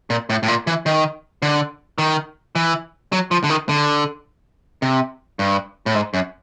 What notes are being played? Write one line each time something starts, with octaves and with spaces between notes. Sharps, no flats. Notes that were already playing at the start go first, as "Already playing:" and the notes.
A#2
A2
A2
A#2
E3
D#3
D3
D#3
E3
F#3
F3
D3
D#3
D3
C3
G2
A2
G#2
F#2